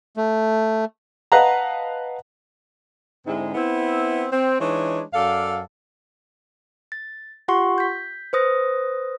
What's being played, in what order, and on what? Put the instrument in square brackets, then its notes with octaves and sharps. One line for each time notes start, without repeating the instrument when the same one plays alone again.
[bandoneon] A3
[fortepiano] B4 D#5 F5 F#5 A5 A#5
[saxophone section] G#2 D3 G#3 C4 E4
B3 C4 E4
C4
E3 G#3 D4 D#4 C#5
F#2 A4 D5 F5
[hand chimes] A6
F4 G4 F#5 C6 C#6
G6 B6
B4 C5 D#6 A#6